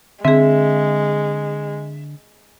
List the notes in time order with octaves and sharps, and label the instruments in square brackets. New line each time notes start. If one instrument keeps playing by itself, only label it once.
[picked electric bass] D3 [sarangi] G#3 [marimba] C4 G#4 [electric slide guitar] E5